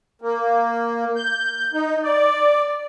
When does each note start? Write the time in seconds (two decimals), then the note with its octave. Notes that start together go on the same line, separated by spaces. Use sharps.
0.22 A#3
1.16 G6
1.73 D#4
2.03 D5